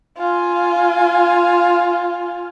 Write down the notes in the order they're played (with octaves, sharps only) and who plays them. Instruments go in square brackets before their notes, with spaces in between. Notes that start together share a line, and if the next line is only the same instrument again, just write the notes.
[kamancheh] F4 G#5